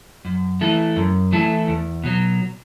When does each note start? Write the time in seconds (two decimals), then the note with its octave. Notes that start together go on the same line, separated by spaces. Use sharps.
0.25 F#2
0.61 E3 A3 E4 A4
0.96 F#2
1.32 E3 A3 E4 A4
1.68 E2
2.04 B2 F#3